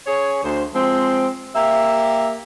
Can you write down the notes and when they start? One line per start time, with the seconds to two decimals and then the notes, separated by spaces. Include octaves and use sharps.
0.07 C#4 G#4 C#5
0.43 D2 C5
0.74 F3 G#3 C4
1.55 A#3 G4 E5